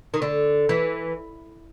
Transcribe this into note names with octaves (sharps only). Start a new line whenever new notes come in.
D#3
D3
E3